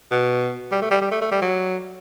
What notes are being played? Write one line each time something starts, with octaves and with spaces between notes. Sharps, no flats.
B2
G3
A3
G3
G3
A3
A3
G3
F#3